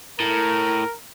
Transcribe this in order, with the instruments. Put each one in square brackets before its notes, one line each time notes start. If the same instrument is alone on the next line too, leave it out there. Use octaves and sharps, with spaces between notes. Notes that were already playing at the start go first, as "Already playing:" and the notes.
[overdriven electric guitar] A2 [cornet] A#4